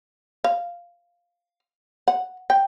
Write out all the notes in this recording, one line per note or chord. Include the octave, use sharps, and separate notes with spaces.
F5
F#5
G5